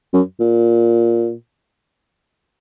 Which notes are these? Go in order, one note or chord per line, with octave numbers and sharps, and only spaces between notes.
F#2
A#2